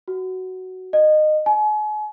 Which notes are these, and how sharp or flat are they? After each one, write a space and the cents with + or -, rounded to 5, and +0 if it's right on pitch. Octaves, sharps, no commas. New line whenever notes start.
F#4 +10
D#5 -20
G#5 +40